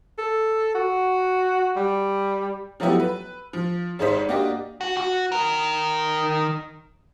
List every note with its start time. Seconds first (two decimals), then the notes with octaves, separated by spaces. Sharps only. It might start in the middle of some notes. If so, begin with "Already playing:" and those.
0.18 A4
0.75 F#4
1.76 G3
2.80 F3 F#3 A3 B3 E4 G4
3.00 B4
3.53 F3
3.99 G#1 G#3 D#4 C5 B6
4.29 A#3 D4 F#4 G4 D5 D#5
4.81 F#4
4.97 F#4
5.32 D#3 A#4